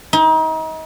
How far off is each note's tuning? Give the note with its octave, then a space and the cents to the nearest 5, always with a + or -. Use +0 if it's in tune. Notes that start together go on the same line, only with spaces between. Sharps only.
D#4 +35